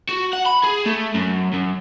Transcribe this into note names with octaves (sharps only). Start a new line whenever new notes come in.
F#4
F#5
B5
G#4
A3
F#2
F#2